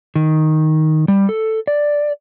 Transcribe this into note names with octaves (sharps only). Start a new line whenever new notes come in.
D#3
G3
A4
D5